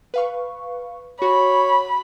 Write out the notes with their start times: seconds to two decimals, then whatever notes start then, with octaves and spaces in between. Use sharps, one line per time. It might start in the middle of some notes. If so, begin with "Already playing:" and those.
0.14 B4 F5 C#6
1.22 F#4 C#5 B5